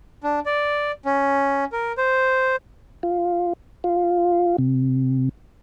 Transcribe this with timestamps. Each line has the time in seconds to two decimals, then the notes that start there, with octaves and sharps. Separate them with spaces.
0.23 D4
0.46 D5
1.05 C#4
1.72 A#4
1.98 C5
3.03 F4
3.84 F4
4.58 C3